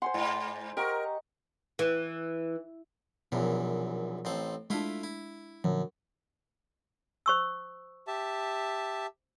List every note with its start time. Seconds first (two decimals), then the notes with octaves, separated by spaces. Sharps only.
0.02 C5 F#5 G#5 C6
0.14 G#2
0.77 G4 A#4 D#5 F#5 C#6
1.79 E3
3.32 A#1 F#2 B2 E3
4.25 A1 C4 A4
4.70 G#3 A3 D4 E4 F4
5.03 E4
5.64 F#2 A#2 D3 F3
7.26 C5 C#6 E6
8.07 G4 E5 A5